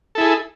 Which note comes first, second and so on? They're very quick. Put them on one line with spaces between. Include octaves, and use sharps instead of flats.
A4 E4 G#4